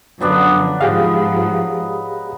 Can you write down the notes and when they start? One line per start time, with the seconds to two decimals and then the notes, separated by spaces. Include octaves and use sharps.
0.20 F#2 D3 F3 F#3 B3 D4
0.81 G#2 F3 G4 G#4 D#5 F5